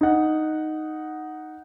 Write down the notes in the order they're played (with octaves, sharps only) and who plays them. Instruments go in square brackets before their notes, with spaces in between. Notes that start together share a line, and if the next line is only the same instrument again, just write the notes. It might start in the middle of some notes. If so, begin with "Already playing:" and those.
[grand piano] D#4 F#5